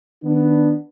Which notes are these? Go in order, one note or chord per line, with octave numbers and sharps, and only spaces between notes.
D#3 B3 D4